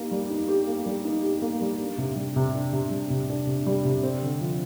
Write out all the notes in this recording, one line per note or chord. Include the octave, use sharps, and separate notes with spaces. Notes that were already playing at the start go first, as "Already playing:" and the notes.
Already playing: A#3 D#4 G4
G3
D#4
G4
A#3
G3
D#4
G4
A#3
G3
D4
C3
G3
C3
D4
C3
G3
C3
D4
C3
G3
C3
C4
D3
F3